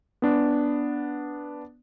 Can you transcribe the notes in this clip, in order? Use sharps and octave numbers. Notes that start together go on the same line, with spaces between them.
B3 D4